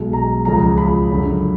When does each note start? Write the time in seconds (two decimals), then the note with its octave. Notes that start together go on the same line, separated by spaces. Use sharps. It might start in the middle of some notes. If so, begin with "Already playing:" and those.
Already playing: B1 B2 G#3
0.13 A#5
0.45 C#2 C#3 F3 A#5
0.78 B5
1.10 F#1 F#2 D3